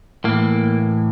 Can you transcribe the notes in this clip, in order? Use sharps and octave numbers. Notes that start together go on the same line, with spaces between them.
A2 E3 A#3